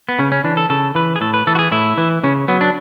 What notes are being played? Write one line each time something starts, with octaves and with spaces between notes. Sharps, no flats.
B3
C#3 C#4
C#4
E3 D4
A4
C#3 A4
E3 B4
G#4
A2 A4
B4
E3 A4
F#4
G#4
A2 E4
E3
C#3 C#4
F#3 B3
D4